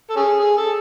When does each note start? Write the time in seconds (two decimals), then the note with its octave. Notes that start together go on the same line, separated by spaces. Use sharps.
0.10 A4
0.16 C#4 G#4
0.39 G#4
0.57 A4